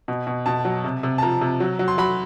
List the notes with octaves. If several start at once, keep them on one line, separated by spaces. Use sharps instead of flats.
B2
B2
B2 A5
F#3
C3
C3
A5
F3 A#5
C3
F#3
F#3
C6
F#3 B5